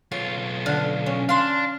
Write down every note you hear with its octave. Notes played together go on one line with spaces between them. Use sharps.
B1 F4 C#5
D3 F5
C#4
D4 F5 C6